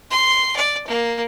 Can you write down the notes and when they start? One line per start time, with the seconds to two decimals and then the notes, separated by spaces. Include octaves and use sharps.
0.11 C6
0.57 D5
0.88 A#3